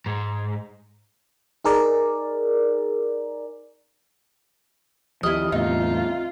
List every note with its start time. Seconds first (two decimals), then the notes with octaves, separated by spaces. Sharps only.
0.06 G#2
1.64 D#4 G#4 A#4 D5
5.23 D#2 F3 E4 G4 D#5 F6
5.52 E2 A2 D3 C4 D#4 F4 E5